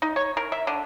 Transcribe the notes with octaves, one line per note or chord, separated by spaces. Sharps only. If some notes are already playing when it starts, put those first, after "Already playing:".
D#4
C#5
A#4
E5
D3